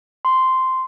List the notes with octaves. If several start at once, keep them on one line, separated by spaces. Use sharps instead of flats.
C6